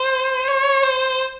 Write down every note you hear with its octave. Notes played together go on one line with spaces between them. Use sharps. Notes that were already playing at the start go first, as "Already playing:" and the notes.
Already playing: C5
C#5
C5